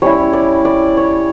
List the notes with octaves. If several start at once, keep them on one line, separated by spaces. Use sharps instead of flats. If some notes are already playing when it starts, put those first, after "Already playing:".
G3 C#4 E4 C#5
D5
D5
C#5